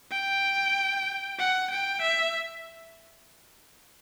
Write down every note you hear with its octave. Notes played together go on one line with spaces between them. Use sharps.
G5
F#5
G5
E5